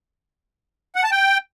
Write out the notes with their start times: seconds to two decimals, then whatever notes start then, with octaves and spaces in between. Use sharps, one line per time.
0.96 F#5
1.04 A5
1.12 G5